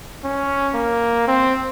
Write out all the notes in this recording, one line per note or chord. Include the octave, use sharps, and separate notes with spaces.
C#4
A#3
C4